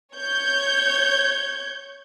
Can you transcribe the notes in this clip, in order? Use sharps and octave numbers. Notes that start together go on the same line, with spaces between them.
C#5 G6 G#6